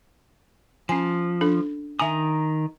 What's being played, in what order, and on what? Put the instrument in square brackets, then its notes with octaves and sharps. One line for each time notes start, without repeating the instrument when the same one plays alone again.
[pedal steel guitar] F3 [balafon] C#4 G#5
[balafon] D4 A4
[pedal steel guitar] D#3 A#5 D#6 [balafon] E5 G#5